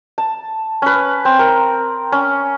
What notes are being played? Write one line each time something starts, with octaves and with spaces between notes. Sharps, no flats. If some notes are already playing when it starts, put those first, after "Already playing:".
A5
C#4 B4
C4
A#4
C#4